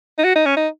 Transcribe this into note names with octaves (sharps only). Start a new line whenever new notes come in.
D#4
F#4
D#4
C#4
D#4